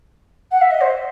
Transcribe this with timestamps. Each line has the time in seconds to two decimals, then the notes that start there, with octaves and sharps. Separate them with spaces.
0.51 F#5
0.61 E5
0.71 D#5
0.81 C5